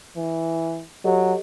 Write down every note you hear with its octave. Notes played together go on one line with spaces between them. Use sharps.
E3
F#3 G4 A4 D#5